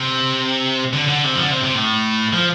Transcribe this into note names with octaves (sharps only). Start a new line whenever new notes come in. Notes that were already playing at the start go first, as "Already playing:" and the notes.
Already playing: C3
D3
D3
C3
F3
D3
C3
C3
A2
F3